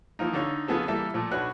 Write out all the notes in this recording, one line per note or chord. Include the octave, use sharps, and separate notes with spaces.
E3 F3 A#3 D#4
D3 D#4 A4 C#5 F5
C#3 F3 B3 G#4 A4
E3 G3 A#3 A4 E5
A#2 F3 A3
B1 D4 F#4 B4 C#5 F#6